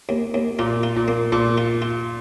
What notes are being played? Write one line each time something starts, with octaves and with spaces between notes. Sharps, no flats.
D#2
D#2
A#2 F4
F4
A#2
A#3
A#2 A4
F4
F4